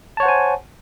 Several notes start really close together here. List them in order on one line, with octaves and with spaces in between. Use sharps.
A5 C#5 F#5 C5 G#5